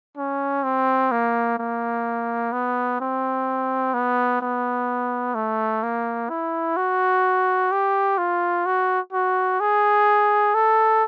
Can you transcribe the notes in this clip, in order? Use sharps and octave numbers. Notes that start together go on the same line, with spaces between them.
C#4
C4
A#3
A#3
B3
C4
B3
B3
A3
A#3
E4
F#4
G4
F4
F#4
F#4
G#4
A4